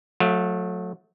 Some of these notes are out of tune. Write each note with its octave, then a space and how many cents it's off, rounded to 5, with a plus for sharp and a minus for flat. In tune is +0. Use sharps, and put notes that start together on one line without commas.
F#3 -30 A3 +0 F5 +0